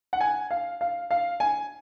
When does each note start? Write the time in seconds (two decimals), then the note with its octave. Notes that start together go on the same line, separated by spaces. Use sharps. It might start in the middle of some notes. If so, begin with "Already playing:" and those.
0.13 F#5
0.21 G#5
0.51 F5
0.81 F5
1.11 F5
1.40 G#5